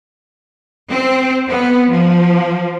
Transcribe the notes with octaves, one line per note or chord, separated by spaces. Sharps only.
C4
B3
F3